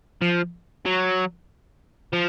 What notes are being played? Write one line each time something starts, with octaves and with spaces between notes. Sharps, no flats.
F3
F#3
F3